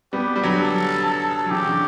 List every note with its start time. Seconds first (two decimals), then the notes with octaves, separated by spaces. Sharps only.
0.13 G3 B3 G4
0.36 G3
0.43 D3 F#3
0.59 A4
1.05 A4
1.46 F#3
1.50 C#3 E3 G4
1.65 D3 F#3